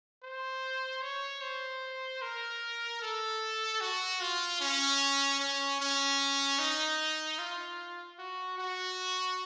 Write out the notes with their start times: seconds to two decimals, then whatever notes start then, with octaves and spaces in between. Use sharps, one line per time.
0.23 C5
1.02 C#5
1.42 C5
2.22 A#4
3.02 A4
3.81 F#4
4.21 F4
4.60 C#4
5.40 C#4
5.80 C#4
6.59 D#4
7.39 F4
8.19 F#4
8.58 F#4